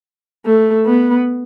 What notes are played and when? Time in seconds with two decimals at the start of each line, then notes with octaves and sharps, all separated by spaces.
0.46 A3
0.86 B3